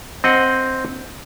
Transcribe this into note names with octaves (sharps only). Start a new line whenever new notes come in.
C4 D#5 F#5